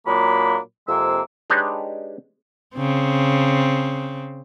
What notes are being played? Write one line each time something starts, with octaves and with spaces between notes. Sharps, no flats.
A#2 F#3 G#3 A#3 D4 B5
F2 C3 G#3 A#3 E6
G#3 D4 D#4 G4 B4 C#5
C#3 C4